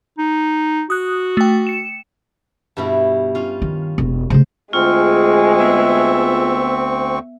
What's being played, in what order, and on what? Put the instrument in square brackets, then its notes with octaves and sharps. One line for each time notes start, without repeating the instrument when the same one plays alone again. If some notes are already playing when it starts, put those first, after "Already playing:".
[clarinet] D#4
[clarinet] F#4 [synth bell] D#6 F#6
[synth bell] A3 G5
C#7 E7
[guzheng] G2 B2 E4
C#4 F4 F5
[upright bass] D#3
E1
[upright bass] C#3 A3 [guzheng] C5
[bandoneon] D2 C4 C#6 [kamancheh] G#3 G#4 [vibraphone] F4
[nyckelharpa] B3 E5